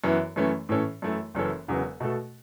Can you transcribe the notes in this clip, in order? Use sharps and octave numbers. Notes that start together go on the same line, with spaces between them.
F#2 E3 B3 E4
F#2 E3 A3 C#4
A2 E3 C#4 A4
F#2 E3 A3 E4
F#1 F#2 E3 C#4 A4
E1 E2 C#3 F#3 B3
B2 A3 F#4 A4